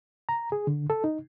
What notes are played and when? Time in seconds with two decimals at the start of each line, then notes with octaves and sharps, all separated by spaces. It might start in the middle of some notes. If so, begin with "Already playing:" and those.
0.29 A#5
0.52 G#4
0.67 D3
0.90 A4
1.04 D#4